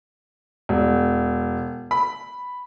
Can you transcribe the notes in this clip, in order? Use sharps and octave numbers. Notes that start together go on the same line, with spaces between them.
E1
B5